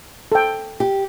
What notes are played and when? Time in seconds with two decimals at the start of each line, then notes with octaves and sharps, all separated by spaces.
0.32 A4 G5
0.80 G4